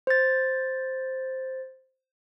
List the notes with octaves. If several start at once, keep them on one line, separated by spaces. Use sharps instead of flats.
C5 A6